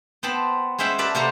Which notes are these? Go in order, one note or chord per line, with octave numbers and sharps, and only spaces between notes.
B3 C4 C5 A5 B5
G#3 C#4 C5 E5 F#5 G5
A#4 B4 D5 E5 A5 B5
C3 A#3 F#4 A4 C5 A#5